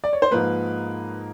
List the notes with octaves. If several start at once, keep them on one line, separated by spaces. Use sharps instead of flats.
D5
C#5
C5
G#2 F3 A#3 D#4 B4